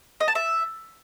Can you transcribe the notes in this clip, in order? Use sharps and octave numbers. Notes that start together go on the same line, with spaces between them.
D#5
A5
E5